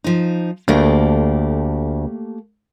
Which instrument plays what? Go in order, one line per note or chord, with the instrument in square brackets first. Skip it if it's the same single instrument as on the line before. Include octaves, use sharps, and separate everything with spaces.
[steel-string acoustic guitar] F3 D#4
[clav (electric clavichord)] D2 [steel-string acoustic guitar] A3 A#3 G4